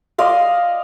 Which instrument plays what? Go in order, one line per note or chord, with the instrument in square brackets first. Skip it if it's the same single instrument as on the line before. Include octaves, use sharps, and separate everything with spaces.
[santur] D5 D#5 F5 C6